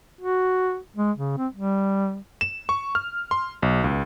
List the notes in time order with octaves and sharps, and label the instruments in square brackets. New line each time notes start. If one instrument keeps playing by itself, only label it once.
[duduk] F#4
G#3
C#3
C4
G3
[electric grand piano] E7
C#6
F6
C6
B1
C#2